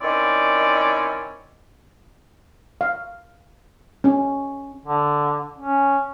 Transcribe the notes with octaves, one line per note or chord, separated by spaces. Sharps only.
D#3 C4 C#4 E4 D5
F5
C#4
D3
C#4